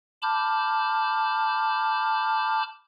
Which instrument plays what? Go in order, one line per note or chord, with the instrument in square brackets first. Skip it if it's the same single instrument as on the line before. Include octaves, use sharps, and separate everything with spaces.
[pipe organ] A5 B5 D6 F6 G6